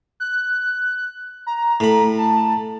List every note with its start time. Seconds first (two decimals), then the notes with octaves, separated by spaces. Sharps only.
0.20 F#6
1.47 A#5
1.80 A2 B5
2.18 A5